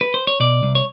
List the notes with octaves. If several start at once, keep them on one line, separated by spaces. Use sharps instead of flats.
B4
C5
C#5
B2 D5
C2
C#5